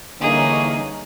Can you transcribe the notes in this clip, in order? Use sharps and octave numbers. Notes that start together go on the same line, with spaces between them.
D3 E3 G3 A#3 C#4 D#4 G#4